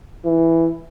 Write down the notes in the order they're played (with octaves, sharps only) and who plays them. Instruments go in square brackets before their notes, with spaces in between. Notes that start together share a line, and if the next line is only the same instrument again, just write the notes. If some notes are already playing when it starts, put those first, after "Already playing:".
[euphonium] E3